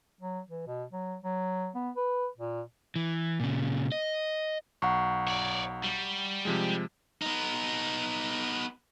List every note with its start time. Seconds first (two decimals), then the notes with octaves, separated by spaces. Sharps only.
0.21 F#3
0.49 E3
0.67 B2
0.93 F#3
1.23 F#3
1.75 B3
1.97 B4
2.38 A#2
2.96 E3
3.40 A#2 C#3
3.92 D#5
4.82 B1 F#5 A#5 C#6
5.28 C#5 D5
5.84 G3
6.45 C3 F3 G#3
7.22 B3 D#4